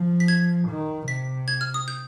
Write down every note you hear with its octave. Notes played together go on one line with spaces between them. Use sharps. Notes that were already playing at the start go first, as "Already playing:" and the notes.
Already playing: F3
B6
G#6
D#3
C3 B6
G#6
F6
D#6
G6